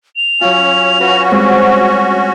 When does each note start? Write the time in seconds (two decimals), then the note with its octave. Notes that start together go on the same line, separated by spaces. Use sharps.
0.16 F7
0.41 F#3 C#4 F4
1.00 C#4 F#4 B4
1.31 G3 G#3 C4 F#5